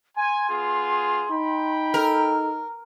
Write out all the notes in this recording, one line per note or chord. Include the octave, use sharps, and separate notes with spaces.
G#5 C6
B3 F4 G#4
D#4 G5 B5
A4 A#4